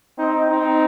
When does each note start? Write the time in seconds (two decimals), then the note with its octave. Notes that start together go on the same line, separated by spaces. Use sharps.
0.18 C4 D#4
0.49 C4 D#4